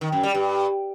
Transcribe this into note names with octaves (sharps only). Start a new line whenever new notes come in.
D#3
F#2
G3
G2